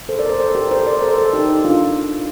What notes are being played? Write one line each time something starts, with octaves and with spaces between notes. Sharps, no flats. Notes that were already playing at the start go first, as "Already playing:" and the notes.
A4 C5
A#4 D5
A4 C5
A4 C5
G4 A#4
A4 C5
A#4 D5
A4 C5
A4 C5
D#4 G4
D4 F4